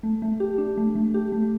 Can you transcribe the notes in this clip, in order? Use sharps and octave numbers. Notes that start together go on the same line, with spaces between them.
A3
A3
G4
D4
A3
A3
G4
A3